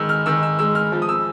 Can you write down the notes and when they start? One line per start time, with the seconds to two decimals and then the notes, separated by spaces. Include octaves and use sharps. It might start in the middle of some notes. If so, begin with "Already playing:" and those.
Already playing: D#3 G#3 E6
0.09 F6
0.26 D#3 E6
0.43 E6
0.59 G#3 E6
0.75 F6
0.92 F3
1.02 D#6
1.09 E6